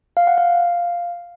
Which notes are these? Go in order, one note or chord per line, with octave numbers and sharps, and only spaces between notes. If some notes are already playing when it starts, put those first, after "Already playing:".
F5
F#5
F5